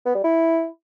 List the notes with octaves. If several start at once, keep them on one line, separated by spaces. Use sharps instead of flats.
B3
G3
E4